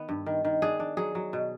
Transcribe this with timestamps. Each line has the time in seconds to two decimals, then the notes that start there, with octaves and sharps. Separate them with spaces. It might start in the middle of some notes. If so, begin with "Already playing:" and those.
Already playing: D#3 B3
0.09 G2
0.26 D#3
0.45 D#3
0.62 D4 G#4
0.80 D4
0.97 F#3 G#4
1.15 F#3
1.33 B2